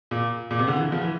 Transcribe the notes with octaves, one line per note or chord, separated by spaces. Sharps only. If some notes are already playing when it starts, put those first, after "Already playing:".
A#2
A#2
C3
D3
E3
F3
E3